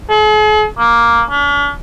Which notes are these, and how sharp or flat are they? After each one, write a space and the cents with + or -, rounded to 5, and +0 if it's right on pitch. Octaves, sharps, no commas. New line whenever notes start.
G#4 +45
A#3 +5
D4 -45